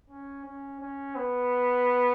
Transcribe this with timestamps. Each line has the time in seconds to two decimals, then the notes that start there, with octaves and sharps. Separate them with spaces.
0.10 C#4
0.46 C#4
0.81 C#4
1.16 B3